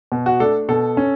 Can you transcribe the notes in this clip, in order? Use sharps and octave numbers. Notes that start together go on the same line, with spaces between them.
B2
F#4
A3 D4 A4
B2 A4
C#4